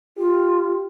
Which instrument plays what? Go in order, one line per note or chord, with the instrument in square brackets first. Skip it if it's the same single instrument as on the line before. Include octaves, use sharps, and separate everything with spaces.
[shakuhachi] F4 [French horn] G4